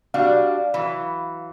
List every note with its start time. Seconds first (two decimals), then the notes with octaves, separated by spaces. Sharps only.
0.14 G3 D4 F#4 F5
0.74 E3 F#3